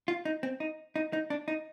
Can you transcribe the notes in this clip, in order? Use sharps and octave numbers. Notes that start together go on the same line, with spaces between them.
F4
D#4
C4
D#4
D#4
D#4
D4
D#4